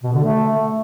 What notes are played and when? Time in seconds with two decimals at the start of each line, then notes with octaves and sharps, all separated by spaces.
0.03 B2
0.13 D3
0.23 A3